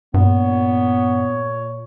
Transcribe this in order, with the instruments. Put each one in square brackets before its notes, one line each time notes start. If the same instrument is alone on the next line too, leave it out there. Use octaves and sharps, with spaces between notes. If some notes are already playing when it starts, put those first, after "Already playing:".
[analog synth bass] G2 [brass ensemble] A#2 C#5 [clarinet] B3